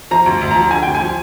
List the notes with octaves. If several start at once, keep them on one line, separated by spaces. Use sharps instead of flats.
F3 A#5
D2
D2
F3 A#5
D3 G#5
D2 G5
G#5
F3